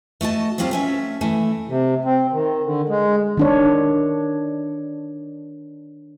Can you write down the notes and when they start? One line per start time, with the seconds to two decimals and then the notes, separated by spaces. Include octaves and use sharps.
0.21 A3 F#4 D#5 A5
0.58 D2 F#3 G3 C4 F4 C5
0.71 A3 C#4 E5
1.21 E3 A3
1.68 C3
2.05 C4
2.32 D#3
2.64 D3
2.89 G#3
3.37 D#3 D4 C#5